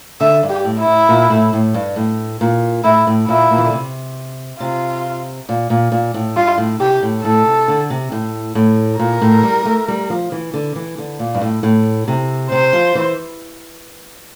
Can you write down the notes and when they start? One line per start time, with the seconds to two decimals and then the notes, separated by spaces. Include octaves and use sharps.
0.20 D3 E5
0.43 G2
0.50 G4
0.64 A2
0.80 E4
0.87 A2
1.09 A#2
1.30 A2
1.53 A2
1.74 G2
1.96 A2
2.41 A#2
2.84 A2 E4
3.07 A2
3.28 A#2 E4
3.51 A#2
3.58 E3
3.65 D3
3.73 C3
4.60 C3 F4
5.49 A#2
5.70 A#2
5.92 A#2
6.14 A2
6.36 G2 F4
6.58 A2
6.80 C3 G4
7.03 A2
7.24 A2 A4
7.46 C3
7.68 D3
7.90 C3
8.12 A2
8.55 A2
8.99 A#2 A#4
9.22 A2
9.43 G3
9.65 A3
9.88 G3
10.10 F3
10.32 E3
10.54 D3
10.76 E3
10.98 D3
11.19 A#2
11.34 G2
11.41 A2
11.63 A2
12.08 C3
12.51 C3 C5
12.73 F3
12.95 E3